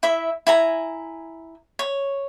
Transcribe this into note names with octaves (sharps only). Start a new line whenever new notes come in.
E4 E5
E4 G#5 A#5
C#5